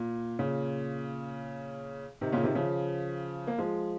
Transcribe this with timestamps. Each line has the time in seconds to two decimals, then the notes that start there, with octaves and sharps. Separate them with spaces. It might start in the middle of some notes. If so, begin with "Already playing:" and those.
Already playing: A#2
0.39 A#2 C#3
2.21 C3 D#3
2.32 A#2 C#3
2.43 C3 D#3
2.55 C#3 F3
3.47 A#3
3.58 F3 G#3